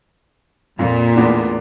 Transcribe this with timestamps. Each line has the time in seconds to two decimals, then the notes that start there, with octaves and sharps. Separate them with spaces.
0.79 F2 A#2
1.16 E2 A2 D4